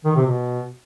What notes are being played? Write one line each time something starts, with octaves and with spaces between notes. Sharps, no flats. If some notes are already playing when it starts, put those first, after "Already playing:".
D#3
C3
B2